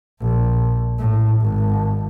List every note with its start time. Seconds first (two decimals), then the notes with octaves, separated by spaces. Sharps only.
0.21 A#1
0.99 A2
1.40 G#1